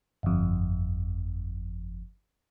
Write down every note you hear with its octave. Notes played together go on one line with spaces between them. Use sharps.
G1 F2